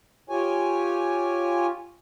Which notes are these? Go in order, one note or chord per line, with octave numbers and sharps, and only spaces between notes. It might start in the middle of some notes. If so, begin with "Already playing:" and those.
F4 G4 C#5 G#5